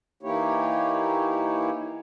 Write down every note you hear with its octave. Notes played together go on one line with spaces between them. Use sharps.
E3 A#3 D#4 E4 G4 C#5